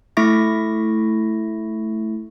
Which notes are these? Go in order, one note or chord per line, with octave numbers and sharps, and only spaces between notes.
A3 E4 E5 C#6 A#6